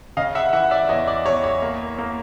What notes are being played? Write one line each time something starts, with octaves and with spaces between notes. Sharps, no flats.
C#3 D#5 F5
E5 F#5
E3 E5 F#5
D5 E5
E2 C#5 D#5
D5
E2 C#5
C#5
A#3
A#3